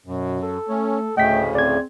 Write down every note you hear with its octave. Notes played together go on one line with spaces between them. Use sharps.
F#2 B2
A4
A3 C#4
D2 A2 C#3 A3 D#5 G5 B6
C4 G#4 D5 G#6